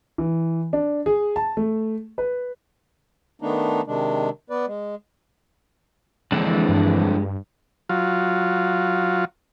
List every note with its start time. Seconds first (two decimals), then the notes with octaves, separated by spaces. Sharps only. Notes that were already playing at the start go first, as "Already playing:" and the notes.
0.18 E3
0.73 D4
1.06 G#4
1.36 A5
1.57 A3
2.18 B4
3.42 D#3 A3 B3 D4 D#4
3.87 C3 D#3 G#3 D4
4.50 B3 B4 D5
4.67 G#3
6.32 F2 D3 E3 G#3 D4
6.69 G2
7.89 F#3 F4